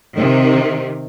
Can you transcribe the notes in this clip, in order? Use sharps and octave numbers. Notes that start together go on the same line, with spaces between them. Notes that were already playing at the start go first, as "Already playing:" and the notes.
C3 D#3